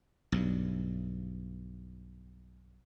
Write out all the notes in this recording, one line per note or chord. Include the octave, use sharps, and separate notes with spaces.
B1 G2